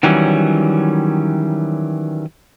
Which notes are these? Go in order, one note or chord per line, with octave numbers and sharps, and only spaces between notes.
D#3 E3 F#3 G3 C#4